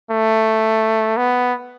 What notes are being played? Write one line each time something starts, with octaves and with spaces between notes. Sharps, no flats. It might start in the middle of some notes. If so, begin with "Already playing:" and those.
A3
B3